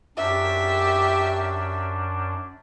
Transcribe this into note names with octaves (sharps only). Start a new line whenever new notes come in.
F#2 D4 G4 E5